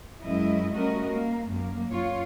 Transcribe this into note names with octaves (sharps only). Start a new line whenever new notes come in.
F#2 G#3 E4 D#5
G3 A3 C#4 F#4 A#4 D#5
A#3
F#2 A#3
F#2 F4 C#5